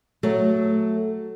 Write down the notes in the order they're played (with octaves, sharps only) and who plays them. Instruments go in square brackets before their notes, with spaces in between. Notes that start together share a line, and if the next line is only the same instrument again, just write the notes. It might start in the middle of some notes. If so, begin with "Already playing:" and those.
[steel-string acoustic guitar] F#3 A3